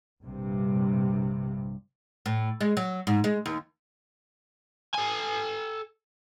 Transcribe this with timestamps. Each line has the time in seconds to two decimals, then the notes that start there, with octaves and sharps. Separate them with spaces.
0.21 A#1 G2 C3
2.26 A2
2.61 G#3
2.77 F#3
3.07 G#2
3.24 G#3
3.46 D#2
4.94 A4 G#5